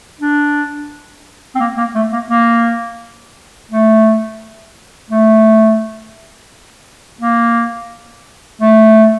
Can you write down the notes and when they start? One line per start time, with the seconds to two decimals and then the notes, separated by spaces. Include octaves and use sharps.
0.20 D4
1.55 C4
1.60 A#3
1.77 A#3
1.95 A3
2.12 A#3
2.30 A#3
3.71 A3
5.10 A3
7.21 A#3
8.61 A3